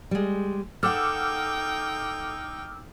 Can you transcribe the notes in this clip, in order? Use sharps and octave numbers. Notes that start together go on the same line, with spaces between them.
G3 G#3
D#4 A4 F#5 G5 D6 E6 F6